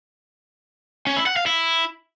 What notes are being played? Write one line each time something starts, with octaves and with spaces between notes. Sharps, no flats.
C#4
E4
F#5
F5
E4